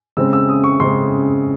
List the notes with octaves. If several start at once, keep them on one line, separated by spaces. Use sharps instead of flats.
C#3 G#3 C4 E6
E6
D#6
C#6
C#3 G#3 C4 C6